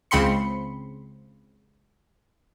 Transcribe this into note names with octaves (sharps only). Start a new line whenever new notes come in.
C#2 C#3 C4 B5 C6 C#7